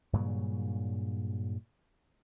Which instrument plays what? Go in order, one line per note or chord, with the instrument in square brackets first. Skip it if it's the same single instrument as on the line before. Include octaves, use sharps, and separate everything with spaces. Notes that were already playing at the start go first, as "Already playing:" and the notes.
[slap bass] G2 A#2 C#3 F#3